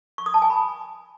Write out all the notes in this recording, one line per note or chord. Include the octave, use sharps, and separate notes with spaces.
C#6
D#6
A5
G#5
B5